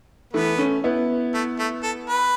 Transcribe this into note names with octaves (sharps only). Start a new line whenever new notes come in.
E3 A3 B3
A3 C#4
B3 E4
A3
A3
A4
B4